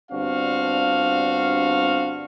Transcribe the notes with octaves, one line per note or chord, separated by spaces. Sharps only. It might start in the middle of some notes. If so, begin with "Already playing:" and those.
G1 C4 D4 F#4 F5